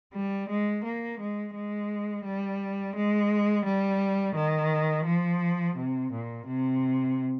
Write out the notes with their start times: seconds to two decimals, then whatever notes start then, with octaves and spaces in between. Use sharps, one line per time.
0.14 G3
0.49 G#3
0.84 A#3
1.20 G#3
1.54 G#3
2.24 G3
2.96 G#3
3.65 G3
4.35 D#3
5.06 F3
5.76 C3
6.12 A#2
6.47 C3